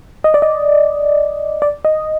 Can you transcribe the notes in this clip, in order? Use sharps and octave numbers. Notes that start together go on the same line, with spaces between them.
D#5
D5
D#5
D5
D#5